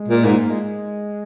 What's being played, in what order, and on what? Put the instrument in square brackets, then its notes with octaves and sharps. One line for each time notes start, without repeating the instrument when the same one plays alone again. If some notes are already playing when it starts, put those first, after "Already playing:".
Already playing: [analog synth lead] G#3
[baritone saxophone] A#2
[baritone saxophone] G#2 [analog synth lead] A#3
[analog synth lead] G#3